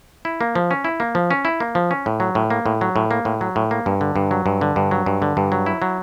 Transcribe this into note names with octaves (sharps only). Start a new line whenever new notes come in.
E4
A#3
F3
C#4
E4
A#3
F3
C#4
E4
A#3
F3
C#4
A2
F#3
A2
A#3
A2
F#3
A2
A#3
A2
F#3
A2
A#3
G2
D3
G2
F#3
G2
D3
G2
F#3
G2
D3
G2
F#3
E4
F#3